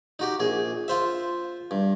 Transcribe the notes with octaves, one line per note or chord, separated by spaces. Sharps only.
D#4 F#4 G4
A#1 G#4
F4 C5 E5
G2